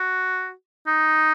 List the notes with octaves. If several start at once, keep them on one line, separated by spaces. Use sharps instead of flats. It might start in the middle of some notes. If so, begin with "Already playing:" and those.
Already playing: F#4
D#4